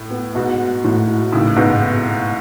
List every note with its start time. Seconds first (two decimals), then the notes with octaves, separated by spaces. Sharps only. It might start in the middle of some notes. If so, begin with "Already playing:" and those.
Already playing: A2
0.10 B3
0.35 G#2 B2 F#4
0.60 F#4
0.84 A2
1.08 F#4
1.32 G#1 A2 C#3
1.56 G#2 B2 B3